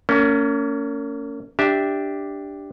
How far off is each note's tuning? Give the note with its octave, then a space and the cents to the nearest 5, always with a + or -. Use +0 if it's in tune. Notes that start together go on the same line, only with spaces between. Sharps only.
A#3 -30 C#4 +25
D4 +0 G4 +0 E5 -15